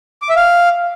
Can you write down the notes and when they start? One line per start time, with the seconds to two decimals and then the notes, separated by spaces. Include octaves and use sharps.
0.22 D6
0.29 E5
0.36 F5